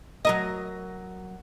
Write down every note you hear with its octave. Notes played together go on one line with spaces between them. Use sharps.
F#3 A#4 D#5